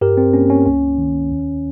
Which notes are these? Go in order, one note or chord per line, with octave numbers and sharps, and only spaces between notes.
G2 G4 A#4
C4
A#3 C#4
C#4
C#2 C#4
D#3
D#2